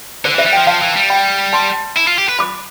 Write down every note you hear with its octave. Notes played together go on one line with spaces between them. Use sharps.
D3 C5
E3
C5 E5
G3
F3 E5 G5
F3 F5 A5
E3
G3
G5 B5
A5 C6
E4
F4
G4
B4
B5 D6